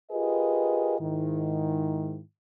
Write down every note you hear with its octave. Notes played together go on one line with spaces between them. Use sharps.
F4 G4 G#4 A#4 B4 D#5
G#2 D#3 E4